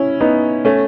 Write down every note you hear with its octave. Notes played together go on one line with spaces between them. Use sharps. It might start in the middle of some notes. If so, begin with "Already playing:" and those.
Already playing: C#4 E4
B3 D#4
A3 C#4